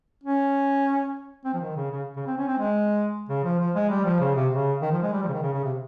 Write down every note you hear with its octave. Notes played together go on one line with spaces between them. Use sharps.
C#4
C4
F3
D#3
C#3
C#3
C#3
C4
C#4
C4
G#3
C#3
F3
F3
G#3
G3
F3
C#3
C3
C#3
D#3
F3
G#3
G3
F3
C#3
D#3
C#3
C#3
C3